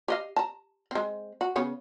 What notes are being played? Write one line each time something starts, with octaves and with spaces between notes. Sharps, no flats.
G4 D#5 F5
A5 A#5
G#3 C4
F#4
C#3 B3 C#5